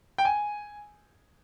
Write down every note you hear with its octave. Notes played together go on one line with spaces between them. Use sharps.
G5
G#5